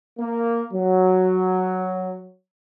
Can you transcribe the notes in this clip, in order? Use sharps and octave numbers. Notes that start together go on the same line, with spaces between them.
A#3
F#3